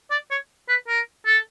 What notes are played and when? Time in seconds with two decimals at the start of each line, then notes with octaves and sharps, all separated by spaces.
0.11 D5
0.31 C#5
0.69 B4
0.88 A#4
1.26 A4